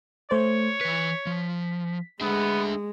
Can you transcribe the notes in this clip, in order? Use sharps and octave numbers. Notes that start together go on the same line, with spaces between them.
A3 C5 C#5
E3 B4 B6
F3
G#3 A3 B3 D4 E5